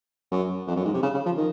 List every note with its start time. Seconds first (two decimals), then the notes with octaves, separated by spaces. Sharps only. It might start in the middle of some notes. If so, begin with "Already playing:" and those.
0.32 F#2
0.67 F2
0.76 F#2
0.85 G#2
0.94 C3
1.03 C#3
1.14 C#3
1.26 F3
1.37 D#3